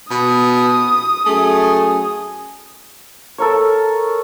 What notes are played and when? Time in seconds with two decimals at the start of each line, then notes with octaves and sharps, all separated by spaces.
0.11 B2 D#6
1.26 F#2 A3 G#4
3.38 A4 A#4 C#5